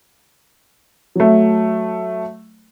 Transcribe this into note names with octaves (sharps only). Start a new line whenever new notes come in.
F#3 A3